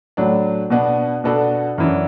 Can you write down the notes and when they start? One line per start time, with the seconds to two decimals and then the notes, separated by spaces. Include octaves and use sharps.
0.17 A2 F#3 D4
0.70 B2 B3 D4
1.24 B2 B3 D4 F#4 A4
1.78 F#2 E3 D4